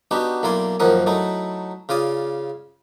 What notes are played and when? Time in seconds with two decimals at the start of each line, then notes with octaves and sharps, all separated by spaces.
0.11 B3 D4 D#4 F#4 G4
0.43 B1 A#3 E4 D5 G#5 C6
0.80 F#2 D#3 F3 A#3 F#5 D#6
1.06 F#3 A3 D#4 E4
1.89 C#3 F4 D5 G#5 D#6